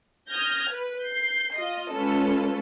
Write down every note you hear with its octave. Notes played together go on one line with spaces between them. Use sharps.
D#6 F6 G6 G#6 A#6
B4
G6 C7
F4 D#5
G#3 C#4 F4 A4 B4